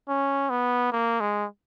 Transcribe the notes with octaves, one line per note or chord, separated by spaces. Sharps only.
C#4
B3
A#3
G#3